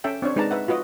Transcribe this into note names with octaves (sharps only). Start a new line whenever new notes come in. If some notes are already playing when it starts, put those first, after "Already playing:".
C#4 A4 E5 G5
C4 D4 C#5
G#3 D#4 B4 D5 A5 A#5
B4 E5 F#5
F4 F#4 B4 D#5